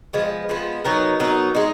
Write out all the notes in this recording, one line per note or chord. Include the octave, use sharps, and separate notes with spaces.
F3 G#3 B3
F3 G#3 B3
F#3 B3 D#4 A#4
F#3 B3 D#4 A#4
G#3 D#4